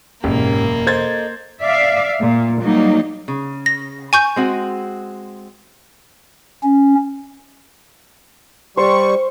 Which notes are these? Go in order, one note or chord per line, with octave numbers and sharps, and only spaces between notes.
F#1 E2 G#2 B2 A#3 C#4 G4
A4 C5 D#5 G#6 A6
D5 E5 F5
A#2
F#3 G3 A#3 D#4
C#3
A#6
G#5 C#6 G6
G#3 C4 F#4
C#4
G3 C5 C#6